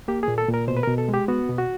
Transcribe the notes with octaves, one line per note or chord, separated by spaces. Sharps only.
A#3 G4
A#2 G#4
A4
A#2
A#4
B2 C5
B4
B2 A#4
A4
G#3
G4
B3 F#4
B2
F#4